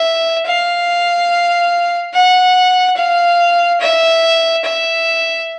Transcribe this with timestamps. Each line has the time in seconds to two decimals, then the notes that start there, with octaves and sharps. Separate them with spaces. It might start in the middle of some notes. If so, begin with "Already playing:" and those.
Already playing: E5
0.46 F5
2.14 F#5
2.97 F5
3.80 E5
4.64 E5